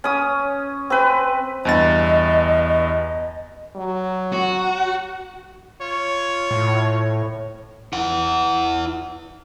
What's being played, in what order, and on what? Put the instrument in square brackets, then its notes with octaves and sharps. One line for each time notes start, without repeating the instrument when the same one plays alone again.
[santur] C#4 D#6
C4 B4
[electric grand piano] E2 G2 A6 [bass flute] D#5
[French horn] F#3
[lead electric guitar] F#4
[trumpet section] F4 C#5
[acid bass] A2
[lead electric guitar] E4 F#5